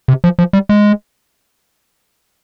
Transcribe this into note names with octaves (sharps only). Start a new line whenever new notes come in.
C3
F3
F3
G3
G#3